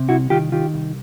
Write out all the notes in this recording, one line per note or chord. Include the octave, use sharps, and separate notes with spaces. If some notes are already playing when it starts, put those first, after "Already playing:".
Already playing: C3
C2 E4 F#4
D#3 F4 G4
D#3 F4 G4
C2